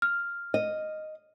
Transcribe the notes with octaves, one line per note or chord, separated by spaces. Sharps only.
F6
D#5